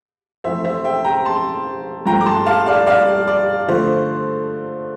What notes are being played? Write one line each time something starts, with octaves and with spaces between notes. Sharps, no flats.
F2 E3 A3 C5 E5
C5 E5
E5 G5
G5 A#5
A5 C6
G2 F3 A3 G5 A#5
D6
A5 C6
F5 A5
D5 F5
D5 F5
D5
D3 F3 A3 C5